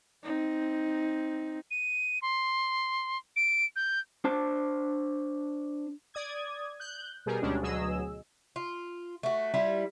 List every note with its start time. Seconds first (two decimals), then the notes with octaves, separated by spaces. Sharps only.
0.23 C4 D#4
1.71 D#7
2.22 C6
3.36 D7
3.76 G6
4.24 D4 C5 A5
6.14 D5 D#6 G#6
6.80 F#6 G6
7.26 B2 G3 G4 G#4 A#4
7.42 D2 B2 G3 G#3 C#4 D4
7.61 D2 B2 F#3 G#4 D#5 E6
8.56 F4
9.23 A3 F#4
9.54 G3 E4 F4